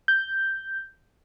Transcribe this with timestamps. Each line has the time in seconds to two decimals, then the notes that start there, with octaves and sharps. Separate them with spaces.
0.08 G6